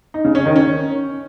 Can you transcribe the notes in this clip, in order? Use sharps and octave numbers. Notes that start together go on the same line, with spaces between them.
D#4
C#3
C#4
D#3
C#4